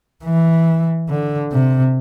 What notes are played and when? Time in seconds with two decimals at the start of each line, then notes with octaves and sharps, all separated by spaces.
0.25 E3
1.09 D3
1.52 C3